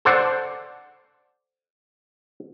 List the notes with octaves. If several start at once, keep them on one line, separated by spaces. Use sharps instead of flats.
A4 C5 D5 F#5